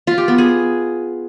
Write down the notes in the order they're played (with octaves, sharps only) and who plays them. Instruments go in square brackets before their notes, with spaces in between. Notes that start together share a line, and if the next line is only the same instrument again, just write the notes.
[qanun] F4
G4
B3
G#4